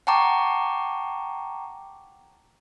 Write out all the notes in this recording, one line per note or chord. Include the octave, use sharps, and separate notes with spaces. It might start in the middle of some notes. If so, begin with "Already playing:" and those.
F#5 G5 A5 A#5 C#6 D6